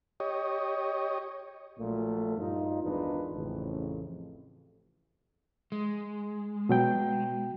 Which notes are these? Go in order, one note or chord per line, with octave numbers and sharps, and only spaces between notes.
G4 C#5 D#5
A#1 A#2 F#3 A3
G2 D#4 F4
G#1 E2 D4 D#4 F4 B4
A1 F2 C#3
G#3
B2 F#3 G5